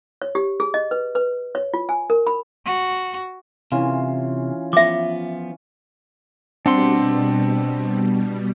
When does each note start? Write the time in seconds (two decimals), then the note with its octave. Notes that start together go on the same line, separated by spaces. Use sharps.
0.22 C#5
0.35 G4
0.60 G#4
0.74 D#5
0.91 B4
1.15 B4
1.55 C#5
1.74 F4
1.89 G#5
2.10 A#4
2.27 B5
2.65 F#4
3.72 C3 E3 C#4 F4
4.73 F3 B3 E5 D6
6.66 B2 G3 C4 D4 F#5 C6